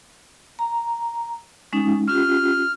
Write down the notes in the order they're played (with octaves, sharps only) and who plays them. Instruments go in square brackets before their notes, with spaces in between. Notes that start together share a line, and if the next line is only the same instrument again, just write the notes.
[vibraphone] A#5
G#3 C#4 D#4
[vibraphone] C#4 F4 G4 [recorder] F6